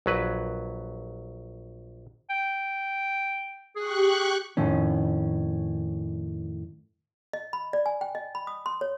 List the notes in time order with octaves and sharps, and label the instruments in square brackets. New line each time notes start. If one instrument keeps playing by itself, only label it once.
[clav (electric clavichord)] A#1 F#3 B4
[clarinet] G5
[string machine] G4 C#6 F#6 [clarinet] G#4
[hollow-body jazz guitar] F2 A2 D#3 C#4
[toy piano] D#5
B5
D5
G#5
G5
D#5
B5
D#6
C6
C#5